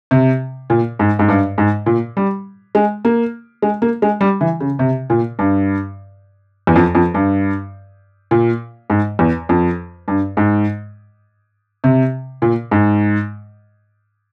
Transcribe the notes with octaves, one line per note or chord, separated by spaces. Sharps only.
C3
A#2
G#2
G#2
G2
G#2
A#2
G3
G#3
A#3
G#3
A#3
G#3
G3
E3
C#3
C3
A#2
G2
E2
F2
F2
G2
A#2
G#2
E2
F2
G2
G#2
C3
A#2
G#2